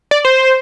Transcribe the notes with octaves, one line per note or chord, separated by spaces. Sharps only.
D5
C5